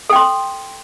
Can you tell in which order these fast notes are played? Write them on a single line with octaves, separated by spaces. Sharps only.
A4 G5 C6